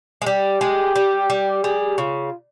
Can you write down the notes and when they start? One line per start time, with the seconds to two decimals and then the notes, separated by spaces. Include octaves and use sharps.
0.22 G#3
0.26 G3 G4
0.61 G#3
0.96 G3
1.30 G3
1.64 G3 G#4
1.98 C#3 F4